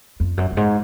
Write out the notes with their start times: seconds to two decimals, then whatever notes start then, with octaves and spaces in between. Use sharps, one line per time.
0.20 F2
0.37 F#2
0.51 F#2
0.57 G#2